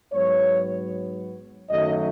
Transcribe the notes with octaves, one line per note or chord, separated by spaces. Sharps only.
G#2 F#3 B3 C#5
F#2 D#3 F#3 A3 D#5